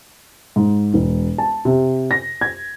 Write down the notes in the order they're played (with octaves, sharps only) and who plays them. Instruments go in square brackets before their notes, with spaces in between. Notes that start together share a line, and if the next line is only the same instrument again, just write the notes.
[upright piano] G#2
E1
A5
C3
A#6
G#6